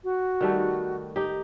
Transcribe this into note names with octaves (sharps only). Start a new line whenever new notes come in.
F#4
D#3 G3 A3
D#4 G4